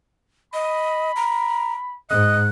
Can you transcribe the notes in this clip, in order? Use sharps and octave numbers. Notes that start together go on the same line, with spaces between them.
D#5 B5
A#5
G#2 D#5 F#6